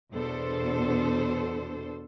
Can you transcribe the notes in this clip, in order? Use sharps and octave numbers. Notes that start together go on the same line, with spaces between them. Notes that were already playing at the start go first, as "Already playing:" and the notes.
E2 B2 D4 A4 C5